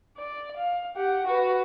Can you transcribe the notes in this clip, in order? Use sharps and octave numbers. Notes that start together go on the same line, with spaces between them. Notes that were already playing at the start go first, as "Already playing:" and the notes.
D5
F5
G4 F#5
F#4 B4